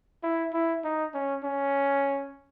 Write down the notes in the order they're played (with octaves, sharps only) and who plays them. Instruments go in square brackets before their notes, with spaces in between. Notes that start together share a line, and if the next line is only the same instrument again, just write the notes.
[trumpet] E4
E4
D#4
C#4
C#4